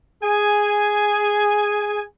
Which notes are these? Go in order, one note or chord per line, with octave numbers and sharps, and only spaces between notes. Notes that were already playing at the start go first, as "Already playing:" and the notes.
G#4 G#5